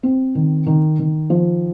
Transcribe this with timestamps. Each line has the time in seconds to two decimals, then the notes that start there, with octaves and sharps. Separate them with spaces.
0.03 C4
0.35 D#3
0.66 D#3
0.99 D#3
1.30 F3